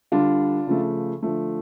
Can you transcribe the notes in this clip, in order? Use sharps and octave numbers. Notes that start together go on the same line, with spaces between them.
D3 G3 D4 F4
C#3 F3 A3
D3 F3 A3